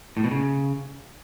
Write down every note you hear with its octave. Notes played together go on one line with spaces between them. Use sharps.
A2
B2
C#3